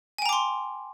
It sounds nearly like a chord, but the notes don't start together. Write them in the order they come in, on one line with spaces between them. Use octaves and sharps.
G#5 G5 A#5 D6 C6